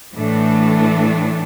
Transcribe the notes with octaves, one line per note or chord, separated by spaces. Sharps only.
A2 E3 A3 D4